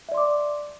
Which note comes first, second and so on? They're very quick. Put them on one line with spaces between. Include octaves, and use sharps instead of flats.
E5 D5 C6 D6